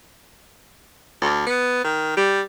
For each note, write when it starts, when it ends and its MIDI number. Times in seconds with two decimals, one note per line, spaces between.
1.22 1.44 38
1.47 1.84 59
1.84 2.16 51
2.17 2.42 55